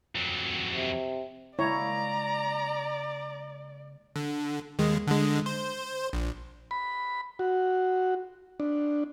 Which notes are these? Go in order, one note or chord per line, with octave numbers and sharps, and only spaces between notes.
F2 F#3
C3
C#3 G#3 A#3 E4 C#5 D5 A#5
D3
D#2 G#3
D3 G#3
C5
A#1
B5
F#4
D4